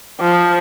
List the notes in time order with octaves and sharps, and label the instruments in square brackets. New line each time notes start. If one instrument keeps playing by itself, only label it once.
[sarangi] F3